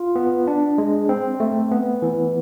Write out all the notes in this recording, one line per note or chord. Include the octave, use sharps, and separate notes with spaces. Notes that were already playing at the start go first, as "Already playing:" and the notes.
Already playing: F4
B3
D4
G#3
C4
A3
B3
E3